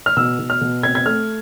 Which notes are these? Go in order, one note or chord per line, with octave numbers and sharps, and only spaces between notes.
F6
B2 E6
B2
F6
B2
C4 G#6
G#6
A3 F6